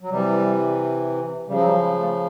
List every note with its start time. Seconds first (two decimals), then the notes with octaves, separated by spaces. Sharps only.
0.01 F#3
0.10 C3 E3 G3
1.48 C#3 F3 G3
1.58 F#3
1.65 G3
1.82 G#3
2.00 A3